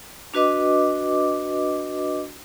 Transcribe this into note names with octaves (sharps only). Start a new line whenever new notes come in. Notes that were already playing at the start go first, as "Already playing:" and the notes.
D4 F#4 B4 D#5 D6